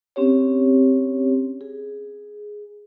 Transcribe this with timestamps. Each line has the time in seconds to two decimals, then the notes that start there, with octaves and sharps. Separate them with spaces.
0.16 C4 C#4 G4 C#5
1.61 G#4